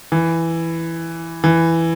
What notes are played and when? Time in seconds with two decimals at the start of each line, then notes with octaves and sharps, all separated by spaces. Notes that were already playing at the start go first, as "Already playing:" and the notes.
0.12 E3
1.44 E3